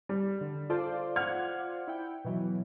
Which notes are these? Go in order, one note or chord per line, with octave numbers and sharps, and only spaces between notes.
G3
D3
F4 A4 C5 D5
F#5 F6 G#6
E4 G5
B2 E3 F#3